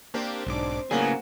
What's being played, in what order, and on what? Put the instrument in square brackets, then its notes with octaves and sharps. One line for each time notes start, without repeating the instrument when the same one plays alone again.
[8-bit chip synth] A#3 D4 G4 [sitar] C4
[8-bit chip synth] B1 G#2 D6 [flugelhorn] D4
[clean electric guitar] A2 C#3 G#5 [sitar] F#3 [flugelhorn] A#3 [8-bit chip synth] B3 G#4